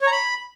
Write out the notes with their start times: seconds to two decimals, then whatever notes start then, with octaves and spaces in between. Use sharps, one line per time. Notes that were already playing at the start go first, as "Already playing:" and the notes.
0.02 C#5
0.07 A#5
0.12 B5